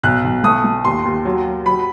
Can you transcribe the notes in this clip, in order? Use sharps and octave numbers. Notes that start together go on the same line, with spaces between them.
B1 F#6
B1
A3 D#6
A3
D#2 C6
D#2
F#3
F#3
F#3 B5